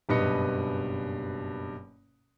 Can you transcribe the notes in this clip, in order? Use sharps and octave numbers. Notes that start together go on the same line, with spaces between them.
F#1 G2 B2 B4 D#5 C#7